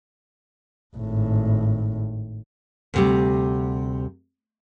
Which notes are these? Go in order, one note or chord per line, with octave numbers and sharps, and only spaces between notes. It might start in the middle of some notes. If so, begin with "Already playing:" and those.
G#1 A2
D2 C3 G3